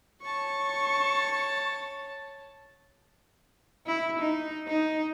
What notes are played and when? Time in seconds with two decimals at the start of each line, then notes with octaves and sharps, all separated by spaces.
0.22 C#5 A5 C#6
3.87 E4
4.19 D#4
4.68 D#4